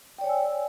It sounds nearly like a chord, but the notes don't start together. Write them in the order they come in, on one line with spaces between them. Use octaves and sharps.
G5 D5 C#5 G#5 E6